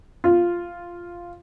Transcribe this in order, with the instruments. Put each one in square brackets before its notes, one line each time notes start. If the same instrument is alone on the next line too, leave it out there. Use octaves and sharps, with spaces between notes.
[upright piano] F4